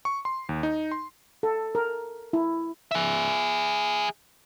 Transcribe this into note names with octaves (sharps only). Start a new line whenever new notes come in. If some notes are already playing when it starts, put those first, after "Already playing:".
C#6
C6
D#2
D#4
C6
A4
A#4
E4
G#4 E5